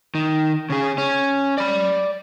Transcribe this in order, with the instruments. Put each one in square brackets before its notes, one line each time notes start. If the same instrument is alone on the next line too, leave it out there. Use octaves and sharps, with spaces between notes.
[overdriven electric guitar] D#3
C#3 G#4
C#4
D5 B5